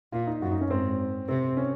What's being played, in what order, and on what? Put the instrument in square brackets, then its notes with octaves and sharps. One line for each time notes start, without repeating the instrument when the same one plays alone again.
[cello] A#2 [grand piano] F4
[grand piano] D#4
[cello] F#2 [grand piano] F#4
[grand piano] D#4
C#4
[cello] G#2 [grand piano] C4
[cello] C3 [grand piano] C4
[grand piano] C#4